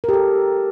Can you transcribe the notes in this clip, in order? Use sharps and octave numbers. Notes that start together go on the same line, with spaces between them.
G4 A4 A#4